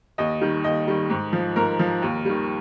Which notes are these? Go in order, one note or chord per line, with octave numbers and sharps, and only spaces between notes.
D#2 D#5
D#3 G3
D#2 D#5
D#3 G3
G#2
F3
G#2 A#4
F3
D#2
D#3 G3